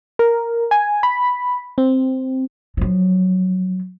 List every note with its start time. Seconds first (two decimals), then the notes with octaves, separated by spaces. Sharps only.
0.19 A#4
0.71 G#5
1.03 B5
1.78 C4
2.77 F3 F#3